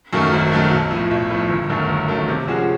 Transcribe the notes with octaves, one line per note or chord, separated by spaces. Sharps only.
F#2 D#3 F#3 A3
G#1
F#2 D#3 F#3 A3
B1
A2 F3
B1
A2 F3
G1
F#2 D#3 F#3 A3
G1
F#2 D#3 F#3 A3
C3
F3 G#3 C#4 F#4